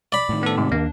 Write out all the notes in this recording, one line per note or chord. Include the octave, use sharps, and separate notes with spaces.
D5 B5
A2 D#3
B3 A4
G#2 C3
D#2 A#3 C4 D4